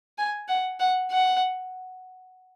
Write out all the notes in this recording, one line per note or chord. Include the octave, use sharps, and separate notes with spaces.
G#5
F#5
F#5
F#5